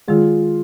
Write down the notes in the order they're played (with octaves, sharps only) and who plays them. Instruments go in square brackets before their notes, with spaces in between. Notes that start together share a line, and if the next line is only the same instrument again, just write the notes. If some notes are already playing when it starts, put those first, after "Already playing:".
[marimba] D#3 G#3 [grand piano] F4 G#4